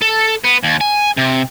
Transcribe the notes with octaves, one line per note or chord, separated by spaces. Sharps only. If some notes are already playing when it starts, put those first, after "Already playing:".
A4
B3
D#2
G#5
C3